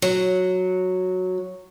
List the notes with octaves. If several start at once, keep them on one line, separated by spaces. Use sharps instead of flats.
F#3